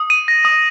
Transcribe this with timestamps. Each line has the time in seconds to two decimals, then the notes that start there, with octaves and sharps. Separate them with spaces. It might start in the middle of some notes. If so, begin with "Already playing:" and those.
Already playing: D#6
0.10 D#7
0.28 A#6
0.45 D#6